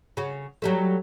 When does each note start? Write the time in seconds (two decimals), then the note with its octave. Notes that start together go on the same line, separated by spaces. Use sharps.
0.17 C#3 F#4
0.62 F#3 G3 A3